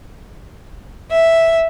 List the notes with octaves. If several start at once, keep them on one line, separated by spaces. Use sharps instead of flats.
E5